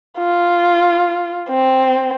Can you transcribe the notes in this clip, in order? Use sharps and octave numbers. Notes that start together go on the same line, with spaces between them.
F4
C4